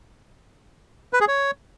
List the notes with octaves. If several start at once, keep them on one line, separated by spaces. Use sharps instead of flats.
B4
G#4
C#5